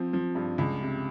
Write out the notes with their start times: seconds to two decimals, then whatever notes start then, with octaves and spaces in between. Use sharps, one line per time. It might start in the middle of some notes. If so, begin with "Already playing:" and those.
Already playing: F3 C4
0.13 F3
0.35 G2
0.58 C#2
0.81 C3